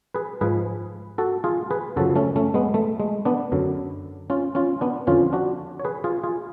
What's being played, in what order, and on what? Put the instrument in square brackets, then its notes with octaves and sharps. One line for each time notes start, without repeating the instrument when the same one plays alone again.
[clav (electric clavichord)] G#4 B4
G#2 F3 G#4 B4
F#4 A4
F4 G#4
G#4 B4
F#2 C#3 F3 F#4 A4
A3 C#4
A3 C#4
G#3 B3
A3
G#3
B3 D4
F#2 D3 F#3
C#4 F4
C#4 F4
B3 D4
F2 D3 F3 C#4 F4
D4 F#4
C#5
G#4 B4
F4 G#4
F4 G#4